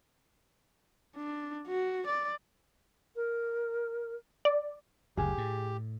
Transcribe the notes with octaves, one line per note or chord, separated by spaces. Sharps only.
D4
F#4
D5
A#4
D5
F#1 D2 G4 G#4
A2